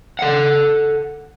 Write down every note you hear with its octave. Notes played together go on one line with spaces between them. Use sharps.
A4 F#5